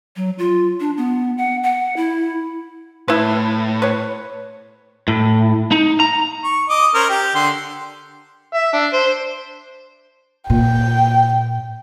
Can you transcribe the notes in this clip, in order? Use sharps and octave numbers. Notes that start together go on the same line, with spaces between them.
F#3
F4
D4
B3
F#5
F#5
E4
A2 E4 B4
B4 C#5
A2
D#4
A#5
C#6
D#5 D6
C#4 A#4 C5
G4 G5
D3 C6
E5
D4
C5
A#2 G5